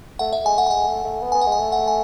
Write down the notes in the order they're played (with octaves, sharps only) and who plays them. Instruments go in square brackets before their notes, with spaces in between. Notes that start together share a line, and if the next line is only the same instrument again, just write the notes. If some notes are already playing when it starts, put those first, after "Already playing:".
[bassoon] A3 [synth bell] F#5
[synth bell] E5
[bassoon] G#3 [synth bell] G#5
[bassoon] A3 [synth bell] F#5
[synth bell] G#5
[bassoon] G#3 [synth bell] F#5
[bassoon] A3
A3
B3
[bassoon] B3 [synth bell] G#5
[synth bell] F#5
[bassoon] G#3
[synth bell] G#5
[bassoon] A3
[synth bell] F#5
G#5